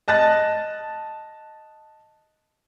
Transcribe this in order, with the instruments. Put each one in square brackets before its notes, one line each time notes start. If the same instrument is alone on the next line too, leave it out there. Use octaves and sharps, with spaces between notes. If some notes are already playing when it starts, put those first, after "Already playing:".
[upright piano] D#5 A5 F#6 A6 A#6